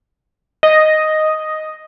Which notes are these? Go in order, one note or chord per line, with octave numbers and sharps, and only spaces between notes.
D#5